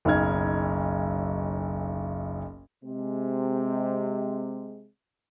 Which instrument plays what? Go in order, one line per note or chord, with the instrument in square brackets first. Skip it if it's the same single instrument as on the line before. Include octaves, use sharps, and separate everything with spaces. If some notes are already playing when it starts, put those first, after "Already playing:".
[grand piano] F#1 B1 D#4 F6 G#6
[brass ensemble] C3 G#3